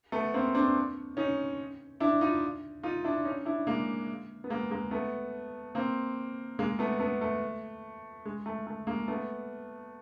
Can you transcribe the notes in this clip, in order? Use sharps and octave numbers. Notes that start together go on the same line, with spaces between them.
A3 B3
A#3 C4
C4 D4
C#4 D#4
D4 E4
D#4 F4
D#4 F4
D4 E4
C#4 D#4
D4 E4
G#3 A#3
B3
G#3 A#3
G#3 A#3
A3 B3
A#3 C4
G#3 A#3
A3 B3
A3 B3
A3
G#3
A3
A3
G#3 A#3
A3 B3